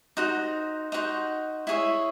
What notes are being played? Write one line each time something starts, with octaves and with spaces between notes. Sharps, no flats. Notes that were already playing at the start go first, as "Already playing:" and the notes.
D#4 F#4 C5
D#4 F#4 C5
E4 G#4 C#5 E5